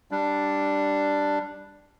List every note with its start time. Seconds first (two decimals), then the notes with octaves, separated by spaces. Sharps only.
0.11 G3 D4